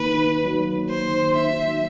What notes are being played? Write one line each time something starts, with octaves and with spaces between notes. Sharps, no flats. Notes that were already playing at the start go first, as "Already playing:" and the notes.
Already playing: D#3 A#3 B4
D#4
F#3
A#3
C5
D#3
D#4 E5
F#3